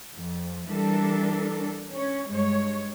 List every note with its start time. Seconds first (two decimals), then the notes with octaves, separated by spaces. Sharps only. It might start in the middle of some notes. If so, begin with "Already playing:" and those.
0.14 F2
0.69 E3 G3 D4 A4 A#4
1.91 C#4 C#5
2.27 G2 G#3 C#5